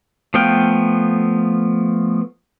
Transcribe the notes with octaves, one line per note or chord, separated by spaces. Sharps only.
F3 A3 B3 F5 G5